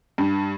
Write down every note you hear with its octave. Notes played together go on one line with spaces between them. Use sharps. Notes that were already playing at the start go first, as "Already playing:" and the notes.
G2